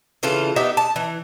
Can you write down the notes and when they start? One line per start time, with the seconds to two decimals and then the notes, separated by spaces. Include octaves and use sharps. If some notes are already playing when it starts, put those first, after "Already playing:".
0.23 C#3 E3 F4 A4
0.56 B3 D#4 G4 E5
0.77 A5
0.96 E3